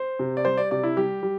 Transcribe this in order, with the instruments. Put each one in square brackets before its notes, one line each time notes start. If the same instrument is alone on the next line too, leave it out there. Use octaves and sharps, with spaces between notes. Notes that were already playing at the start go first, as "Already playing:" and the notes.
Already playing: [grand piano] C5
C3
D5
G3 C5
D5
C3 D5
E4
G3 G4
G3